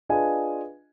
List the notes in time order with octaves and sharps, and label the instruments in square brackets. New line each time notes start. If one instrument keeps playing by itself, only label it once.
[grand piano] D4 F4 G#4 B4 D#5 G#5